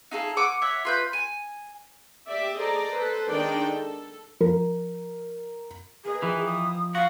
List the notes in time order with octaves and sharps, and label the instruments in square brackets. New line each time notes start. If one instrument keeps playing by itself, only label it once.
[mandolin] D#4 F4 G#4 A4
F#5 G#5 D6 E6
C#5 E5 F#5
F4 B4 G6
G#5
[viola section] G4 D5 E5
G#4 A4 C5 D5 D#5 A#5
A4 B4 C5
D#3 G#3 D4 D#4 D5 G5
A4
[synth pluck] F3 [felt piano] A#4
[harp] A#3 B4 D#5 [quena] G#4
[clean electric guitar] E3 [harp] F3 G4
[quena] D#6
[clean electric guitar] F#4 [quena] F5